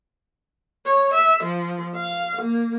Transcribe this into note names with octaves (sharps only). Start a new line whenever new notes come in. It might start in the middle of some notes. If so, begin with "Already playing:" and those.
C#5
E5
F3
F5
A#3